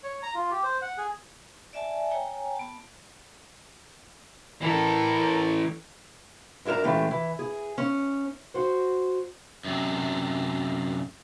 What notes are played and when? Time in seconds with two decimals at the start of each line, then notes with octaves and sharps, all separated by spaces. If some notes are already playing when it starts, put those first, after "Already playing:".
0.03 C#5
0.23 A#5
0.35 F4
0.51 G4
0.64 C5
0.82 F#5
0.98 G#4
1.73 D5 E5 G#5 A5
2.10 C#5 G5 G#5 A#5
2.56 B3 A5
4.63 E3 A4 A#4
6.65 F#2 D4 G#4 A#4 A#5
6.84 A#2 E3 G#3 A3 C#4 G4
7.11 E3
7.39 G#4
7.78 C#4
8.54 F#4 C5
9.64 F#2 C3